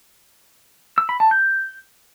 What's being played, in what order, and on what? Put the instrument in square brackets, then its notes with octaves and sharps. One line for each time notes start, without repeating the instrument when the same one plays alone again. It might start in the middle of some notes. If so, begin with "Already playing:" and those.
[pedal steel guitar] E6
B5
A5
G6